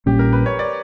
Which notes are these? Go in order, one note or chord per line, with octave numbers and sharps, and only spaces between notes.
A#1 A#2 G3 C#4 G4
A#4
B4
C#5
D5